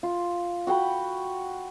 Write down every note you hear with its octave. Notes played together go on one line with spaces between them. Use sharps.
F4
F#4 F#5 G5 B5